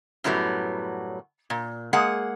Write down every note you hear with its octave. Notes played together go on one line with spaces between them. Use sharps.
F#2 A2 F#3 G3 B3
A#2
G#3 A#3 G#4 F#5